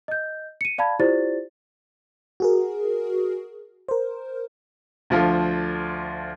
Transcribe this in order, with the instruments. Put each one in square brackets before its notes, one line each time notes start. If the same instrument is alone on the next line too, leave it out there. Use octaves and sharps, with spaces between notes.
[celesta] D#5 G6
C#7 D#7
D5 F5 A5 B5 G#6
E4 F4 G4 C5 D5 A6
[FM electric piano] F#4 G#4 A#4
A#4 C5
[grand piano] D2 F3 F4 A4